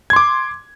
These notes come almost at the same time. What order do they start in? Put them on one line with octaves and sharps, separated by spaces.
G#6 C6 D6